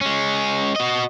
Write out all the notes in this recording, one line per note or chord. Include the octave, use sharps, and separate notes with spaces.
G#3 C#4
F#4 D#5